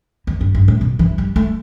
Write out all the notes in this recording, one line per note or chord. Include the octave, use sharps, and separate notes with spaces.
E2
G2
G2
A2
B2
E3
G3
A3